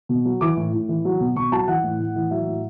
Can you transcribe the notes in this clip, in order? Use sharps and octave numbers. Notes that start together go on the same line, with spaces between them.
B2
F#3
E3 D6
A2
A2
E3
F#3
B2
B2 C#6
F#3 A5
E3 F#5
A2
A2
E3
F#3 E5
A2